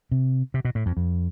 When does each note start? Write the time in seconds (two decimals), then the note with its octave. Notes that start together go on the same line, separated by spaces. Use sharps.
0.11 C3
0.54 C3
0.65 B2
0.75 A2
0.86 F2
0.97 F2